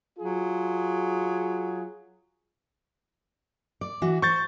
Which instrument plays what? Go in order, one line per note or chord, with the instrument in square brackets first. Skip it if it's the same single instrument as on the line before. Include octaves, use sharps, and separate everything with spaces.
[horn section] F#3 F4 G#4
[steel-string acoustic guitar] D5
E3 F#4
[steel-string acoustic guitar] C5 [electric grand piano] C#6 G6 A6